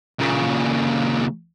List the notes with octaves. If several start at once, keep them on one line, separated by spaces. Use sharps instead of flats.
A#2 C#3